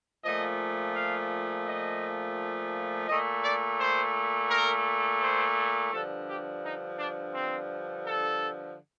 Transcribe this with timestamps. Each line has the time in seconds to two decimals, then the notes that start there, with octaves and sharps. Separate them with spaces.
0.24 A#2 F3 A3 D#5
0.95 F5
1.66 D#5
3.08 A#2 A3 D#5
3.43 D5
3.80 C5
4.50 A#4
5.22 C5
5.92 G2 D3 F3 A4
6.28 G4
6.63 D#4
6.98 D4
7.34 C4
8.05 A4